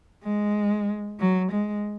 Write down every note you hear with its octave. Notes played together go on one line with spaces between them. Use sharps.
G#3
F#3
G#3